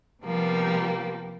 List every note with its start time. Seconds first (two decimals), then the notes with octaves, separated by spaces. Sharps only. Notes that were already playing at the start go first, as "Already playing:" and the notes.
0.22 C3 F3 G3 A#3 B3